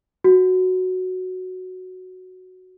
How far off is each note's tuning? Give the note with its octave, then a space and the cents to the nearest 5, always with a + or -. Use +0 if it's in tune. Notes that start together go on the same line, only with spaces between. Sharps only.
F#4 +0